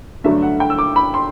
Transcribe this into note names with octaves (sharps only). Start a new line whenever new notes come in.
G2 D3 F#3 A3 D4 E5
F#5
G5
E6
D6
B5
C6